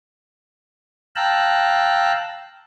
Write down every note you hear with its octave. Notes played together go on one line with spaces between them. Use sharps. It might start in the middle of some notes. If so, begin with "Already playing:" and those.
F5 G5 A5 A#5 E6 F#6